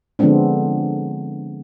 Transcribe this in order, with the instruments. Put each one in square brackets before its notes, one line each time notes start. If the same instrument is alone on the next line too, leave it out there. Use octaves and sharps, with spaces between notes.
[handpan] D3 F3 G#3 B3 C4 D4